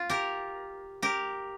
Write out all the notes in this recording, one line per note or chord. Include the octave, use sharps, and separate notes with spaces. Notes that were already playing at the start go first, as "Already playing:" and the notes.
Already playing: F4
G4 A#4
G4 A#4